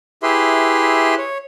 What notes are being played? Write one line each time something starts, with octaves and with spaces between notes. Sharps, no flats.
E4 G4 G#4 B4 E5 C6
C#5